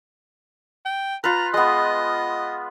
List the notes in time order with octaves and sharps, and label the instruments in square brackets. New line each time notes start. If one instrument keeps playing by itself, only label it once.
[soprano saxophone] G5
[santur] F4 B4 [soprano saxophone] A#5
[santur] G#3 B3 [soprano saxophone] D#5